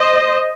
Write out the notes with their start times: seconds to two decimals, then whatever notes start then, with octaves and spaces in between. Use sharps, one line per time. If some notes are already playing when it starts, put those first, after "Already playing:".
Already playing: C5 D#5